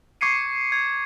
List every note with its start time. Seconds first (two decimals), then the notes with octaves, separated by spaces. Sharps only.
0.21 C#6 D6 G#6 C7 C#7 D#7
0.72 G#6